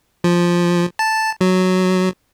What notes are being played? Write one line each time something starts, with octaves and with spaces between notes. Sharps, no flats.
F3
A5
F#3